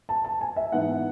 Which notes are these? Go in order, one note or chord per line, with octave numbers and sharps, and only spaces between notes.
A5
A5
G#5
E5
G#2 E3 B3 D#4 F#5